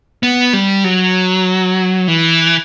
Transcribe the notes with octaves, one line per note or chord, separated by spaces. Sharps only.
B3
G3
F#3
E3